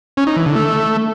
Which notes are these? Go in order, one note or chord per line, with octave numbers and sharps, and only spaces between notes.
C#4
D#4
E3
D3
A3